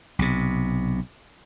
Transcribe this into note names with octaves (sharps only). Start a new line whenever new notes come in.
B1 C3